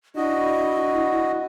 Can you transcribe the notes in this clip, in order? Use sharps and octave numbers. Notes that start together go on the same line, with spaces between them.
D4 E4 F#4 D#5